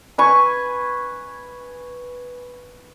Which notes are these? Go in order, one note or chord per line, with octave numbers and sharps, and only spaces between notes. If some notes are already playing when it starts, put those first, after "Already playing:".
B4 G#5 C#6